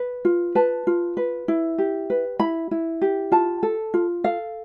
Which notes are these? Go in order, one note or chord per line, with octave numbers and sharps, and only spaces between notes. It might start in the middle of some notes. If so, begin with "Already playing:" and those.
Already playing: B4
F4
B4 A5
F4
B4
E4
G4
B4
E4 B5
E4
G4
F4 A5
A4
F4
A4 F5